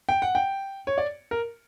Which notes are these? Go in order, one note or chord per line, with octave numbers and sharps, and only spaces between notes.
G5
F#5
G5
C#5
D5
A#4